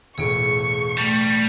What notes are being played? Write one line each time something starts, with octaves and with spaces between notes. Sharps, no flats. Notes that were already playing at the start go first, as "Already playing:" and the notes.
E1 A2 G#4 C#6 D7
G3 A3